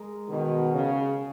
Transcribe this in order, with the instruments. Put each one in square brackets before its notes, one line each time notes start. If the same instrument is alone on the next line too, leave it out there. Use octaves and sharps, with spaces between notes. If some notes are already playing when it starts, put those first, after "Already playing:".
Already playing: [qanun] G#3 A#4
[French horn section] B2 D#3
C#3